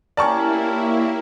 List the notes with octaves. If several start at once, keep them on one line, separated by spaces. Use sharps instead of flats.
A#3 C#4 E4 G4 A#4 D5 A5 C#6